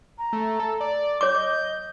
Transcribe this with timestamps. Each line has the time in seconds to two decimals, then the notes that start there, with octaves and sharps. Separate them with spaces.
0.18 A#5
0.33 A3
0.59 A4
0.81 D5
1.21 C#5 D6 G6
1.35 D#5 D6